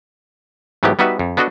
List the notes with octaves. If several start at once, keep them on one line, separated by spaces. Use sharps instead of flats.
G#2 E3 F#3 A3 B3 G4
G3 B3 D#4 F#4 B4 E5
F2
B3 D4 F#4 A4 D#5